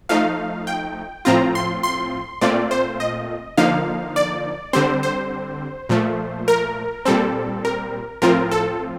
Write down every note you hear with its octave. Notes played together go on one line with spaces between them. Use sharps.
F3 A3 D#4 F5
G5
A2 F3 C4 F4 A#5
C6
C6
A#2 A3 C4 F4 D5
C5
D#5
D3 F3 A#3 D#4 F5
D5
D3 G3 C4 C5
C5
A#2 F3 A3
A#4
A#2 G3 C4 A4
A#4
A2 F3 C4 F4 A#4
A4